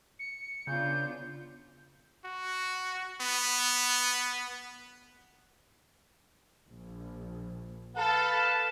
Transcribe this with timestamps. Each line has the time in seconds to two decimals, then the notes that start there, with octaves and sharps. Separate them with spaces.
0.19 C#7
0.67 C#3 B3 D4 F4 G6
2.25 F#4
3.21 B3
6.67 A#1
7.97 A4 B4 F5 A5